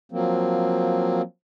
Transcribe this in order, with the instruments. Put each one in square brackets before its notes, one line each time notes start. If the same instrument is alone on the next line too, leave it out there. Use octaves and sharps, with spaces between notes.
[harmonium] F3 F#3 A#3 C4